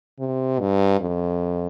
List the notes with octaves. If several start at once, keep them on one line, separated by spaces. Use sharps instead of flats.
C3
G2
F2